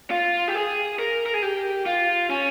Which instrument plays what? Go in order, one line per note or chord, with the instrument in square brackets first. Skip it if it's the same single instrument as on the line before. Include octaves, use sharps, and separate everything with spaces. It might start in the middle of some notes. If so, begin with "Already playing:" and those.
[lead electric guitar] F4
G4
G#4
A#4
A#4
G#4
G4
F4
C#4